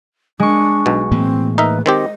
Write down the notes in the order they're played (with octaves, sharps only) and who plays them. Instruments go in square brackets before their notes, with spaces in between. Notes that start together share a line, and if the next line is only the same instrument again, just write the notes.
[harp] G#3 C#6 [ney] D4
[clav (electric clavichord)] B1 B2
[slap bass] A2 E3 A#3 [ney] C4
[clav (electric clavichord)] D#4 A#4 E5 [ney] B4
[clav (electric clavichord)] D#3 C4 G4 [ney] D#5